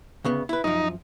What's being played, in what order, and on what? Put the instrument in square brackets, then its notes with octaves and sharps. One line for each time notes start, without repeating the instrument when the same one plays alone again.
[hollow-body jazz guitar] D2 C#3 B3
E4 B4
[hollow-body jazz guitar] F#2 F3 [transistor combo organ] D#4